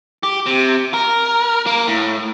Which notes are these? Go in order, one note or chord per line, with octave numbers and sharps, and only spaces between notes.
G4
C3
A#4
A#3
A2